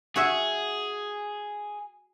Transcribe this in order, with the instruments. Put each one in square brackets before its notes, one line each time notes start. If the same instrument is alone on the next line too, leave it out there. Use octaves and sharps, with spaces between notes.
[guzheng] F#4 C#5 E5 [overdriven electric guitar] G#4